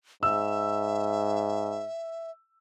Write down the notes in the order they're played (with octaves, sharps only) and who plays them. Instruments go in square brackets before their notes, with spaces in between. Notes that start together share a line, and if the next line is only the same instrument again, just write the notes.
[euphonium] G#2 [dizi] E5 [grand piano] E6